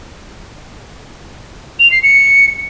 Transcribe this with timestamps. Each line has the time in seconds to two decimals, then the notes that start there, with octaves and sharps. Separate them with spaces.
1.79 F7
1.91 C7
2.03 C#7